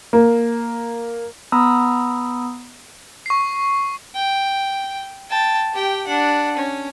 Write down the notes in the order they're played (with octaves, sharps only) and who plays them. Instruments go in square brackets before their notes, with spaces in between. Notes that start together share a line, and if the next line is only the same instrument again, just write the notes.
[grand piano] A#3
[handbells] B3 A#5 B5 D#6 E6
[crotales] C#6 C7
[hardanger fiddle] G5
G5 A5
G4 G5
D4 F#5
C#4